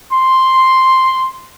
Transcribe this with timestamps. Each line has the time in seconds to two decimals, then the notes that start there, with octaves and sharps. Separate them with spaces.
0.12 C6